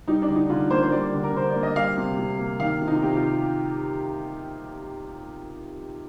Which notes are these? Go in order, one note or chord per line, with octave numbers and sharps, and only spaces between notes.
G3 D#4
D4
D3
D#4
D3 F4
A#3 C5
C5
G3 D5
D3
A#4
D3 C5
D5
A#3
D#5
G3 F5
C3
C3
A#3
D#3 F5
C3
D#4
F4
C3 G4
F4